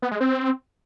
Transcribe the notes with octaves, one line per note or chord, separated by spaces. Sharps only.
B3
G#3
C4